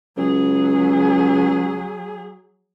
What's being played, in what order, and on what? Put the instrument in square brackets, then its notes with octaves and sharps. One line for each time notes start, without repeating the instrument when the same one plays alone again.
[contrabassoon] C#2 [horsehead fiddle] F#3 G#4